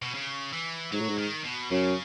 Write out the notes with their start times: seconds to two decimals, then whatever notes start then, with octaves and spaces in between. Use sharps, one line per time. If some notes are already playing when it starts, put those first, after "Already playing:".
0.02 B2
0.14 C#3
0.53 E3
0.92 G#2 F#3
1.00 A2
1.09 G#2
1.18 D#3
1.45 B2
1.71 F#2 C#3